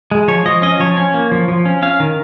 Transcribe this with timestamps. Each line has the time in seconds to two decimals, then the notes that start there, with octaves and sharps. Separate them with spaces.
0.11 G#3
0.28 F3 C#5
0.45 F3 D#5
0.62 C#4 D#5
0.80 F3 C#5
0.97 C#4
1.14 A#3
1.32 F3
1.48 F3
1.65 C#4
1.82 C#4 F5
2.00 D#3